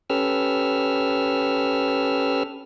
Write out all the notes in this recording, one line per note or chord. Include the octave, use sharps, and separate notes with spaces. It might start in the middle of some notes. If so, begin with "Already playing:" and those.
C#4 G4 A4 B4 E6 F6